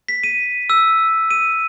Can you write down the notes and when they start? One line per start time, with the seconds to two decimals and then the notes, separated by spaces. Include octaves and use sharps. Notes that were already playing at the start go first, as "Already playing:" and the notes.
0.09 B6
0.24 D#7
0.70 E6
1.31 D#7